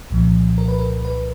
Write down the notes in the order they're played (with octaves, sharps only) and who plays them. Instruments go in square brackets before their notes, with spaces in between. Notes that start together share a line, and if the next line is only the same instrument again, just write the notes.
[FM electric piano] C2 A#2 F3
A#4
B4
A#4
B4